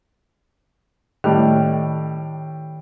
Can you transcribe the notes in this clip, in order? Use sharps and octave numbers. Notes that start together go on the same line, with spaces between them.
A2 D#3 G3